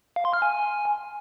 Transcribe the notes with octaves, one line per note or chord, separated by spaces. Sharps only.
F5
C6
F6
G#5